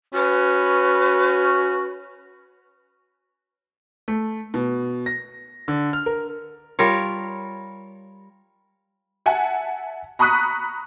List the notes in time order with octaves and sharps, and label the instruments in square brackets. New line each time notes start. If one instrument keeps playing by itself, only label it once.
[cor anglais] C#4 [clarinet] F#4 [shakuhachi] B4
[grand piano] A3
B2
A#6
D3
F6
A#4
[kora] G3 F4 A#4 C#5
[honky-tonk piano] E5 F#5 G#5 A5
A#5 B5 C#6 D#6 F#6 B6